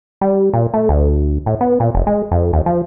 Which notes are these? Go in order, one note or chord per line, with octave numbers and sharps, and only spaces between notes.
G3
A#2
A3
D2
A2
B3
A#2
F1
G#3
F2
D#2
F3